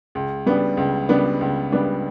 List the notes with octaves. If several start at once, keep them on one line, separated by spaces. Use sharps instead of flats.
C#2
C#3 G3 B3 D4
C#2
C#3 G3 B3 D4
C#2
C#3 G3 B3 D4